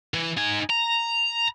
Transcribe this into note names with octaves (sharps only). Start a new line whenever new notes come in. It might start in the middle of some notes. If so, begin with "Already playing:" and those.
E3
D#4 G#5
A#5